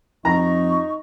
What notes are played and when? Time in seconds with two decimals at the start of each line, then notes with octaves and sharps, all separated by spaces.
0.25 F2 D#4 A#5 C#6